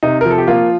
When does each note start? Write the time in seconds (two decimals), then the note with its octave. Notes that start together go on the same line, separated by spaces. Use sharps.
0.03 C3 D#4
0.21 A#4
0.25 F3 A4
0.38 G4
0.47 F3 A#3 F4